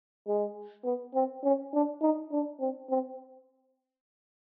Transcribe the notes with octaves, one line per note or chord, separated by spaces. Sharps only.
G#3
B3
C4
C#4
D4
D#4
D4
C4
C4